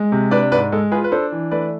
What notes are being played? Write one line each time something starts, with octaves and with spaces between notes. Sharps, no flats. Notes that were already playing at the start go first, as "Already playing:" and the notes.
Already playing: G#3
C3
D4 B4 D5
G#2 B4 D5
G#3 A4
F4 G#4 B4
B4
D4 A4 C5
E3
A3 B4 D5